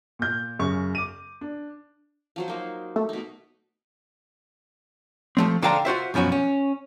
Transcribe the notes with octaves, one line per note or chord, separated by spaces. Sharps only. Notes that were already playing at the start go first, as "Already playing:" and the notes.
A#2 G6
F#2 C#3 C#6
D6 D#7
D4
F3 F#3 C5
A#3 D#4
A3
B2 D#4
F3 A3 C4
D3 A4 C5 F5 G5 A#5
F4 F#4 C5 E5
F#2 B2 F3 C#4 F#4
C#4